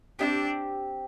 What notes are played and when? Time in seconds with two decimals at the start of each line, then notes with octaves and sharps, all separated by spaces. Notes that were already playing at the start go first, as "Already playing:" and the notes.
0.19 C4 D4 D#4 G4